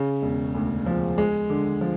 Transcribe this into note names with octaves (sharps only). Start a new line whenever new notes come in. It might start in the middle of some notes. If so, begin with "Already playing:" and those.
Already playing: C#3
E1
D2
F3
G#3
D3
F3